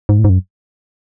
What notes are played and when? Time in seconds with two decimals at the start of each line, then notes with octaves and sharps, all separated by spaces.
0.09 G#2
0.19 A2
0.24 G#2
0.29 F#2